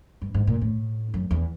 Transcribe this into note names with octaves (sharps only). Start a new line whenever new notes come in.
G2
G#2
A#2
A2
F#2
E2